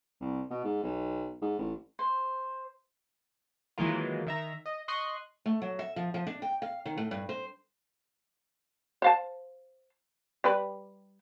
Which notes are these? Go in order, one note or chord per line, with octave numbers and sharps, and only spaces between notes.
C2
B2
G#2
B1
G#2
A1
C5
D#3 E3 F#3 G#3 A#3 F4
D#3 E5 A#5
D#5
D#5 C6 C#6 D#6 F#6 C7
A3
F#3
E5
F3
F3
D4
G5
F5
D#3
A2
G2
C5
C5 F5 A5
G3 G4 B4